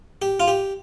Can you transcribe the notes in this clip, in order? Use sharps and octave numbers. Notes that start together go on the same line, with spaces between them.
G4
F4
G4